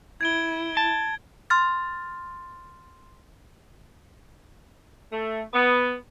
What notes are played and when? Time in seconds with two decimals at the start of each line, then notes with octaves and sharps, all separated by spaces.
0.21 E4 G#6 D7 G7
0.77 A5
1.50 C6 F6 A6
5.12 A3
5.53 B3